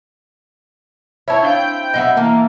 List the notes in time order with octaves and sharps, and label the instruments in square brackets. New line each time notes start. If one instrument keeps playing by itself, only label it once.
[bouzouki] C4 E4 [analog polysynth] C#5 [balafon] E5 A5
[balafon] D4 F5 [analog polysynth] G5 G6
[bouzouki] F#3 B3 E5 [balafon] D#5 F#5
[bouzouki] E3 A#4 A5 [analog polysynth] A#3